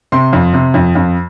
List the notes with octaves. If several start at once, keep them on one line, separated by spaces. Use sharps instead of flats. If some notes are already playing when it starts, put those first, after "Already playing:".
C3 C6
F2
C3
F2
F2